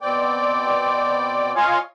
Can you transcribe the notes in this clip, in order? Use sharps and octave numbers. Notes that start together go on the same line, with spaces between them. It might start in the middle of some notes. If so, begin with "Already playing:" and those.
B2 C4 D5 G5
F4 C#5 D#5 F5 G#5